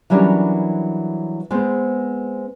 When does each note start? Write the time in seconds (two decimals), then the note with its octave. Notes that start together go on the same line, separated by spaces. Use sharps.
0.10 E3 F#3 G3 C#4 D4 A#4
1.51 G#3 B3 C4 C5